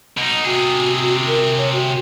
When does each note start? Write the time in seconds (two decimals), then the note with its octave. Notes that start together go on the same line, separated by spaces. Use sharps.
0.17 B2 D#4
0.45 C3 F#4 G#4
1.27 A#4
1.57 C#5
1.73 F#4